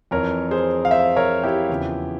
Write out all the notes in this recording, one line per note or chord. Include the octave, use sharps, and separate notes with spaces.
F2 E3 A#4 C#5
G#4 C5
F5
C5 E5
A#4 C#5
E4 G4
E2 C#3 F3